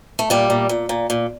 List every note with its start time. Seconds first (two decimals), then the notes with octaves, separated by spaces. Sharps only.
0.19 A3
0.30 A#2 G3
0.50 A#2
0.69 A#2
0.89 A#2
1.10 A#2